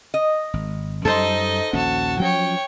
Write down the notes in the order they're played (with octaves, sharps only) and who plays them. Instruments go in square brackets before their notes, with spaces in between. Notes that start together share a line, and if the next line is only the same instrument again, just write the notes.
[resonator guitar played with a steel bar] D#5
[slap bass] G#1
[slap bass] F#2 G3 [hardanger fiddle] D#4 D#5 [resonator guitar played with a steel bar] A4 C5
[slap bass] A#1 D#2 C#4 [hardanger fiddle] F#4 A5
[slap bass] F3 F#3 C#4 [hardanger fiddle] C#5 G5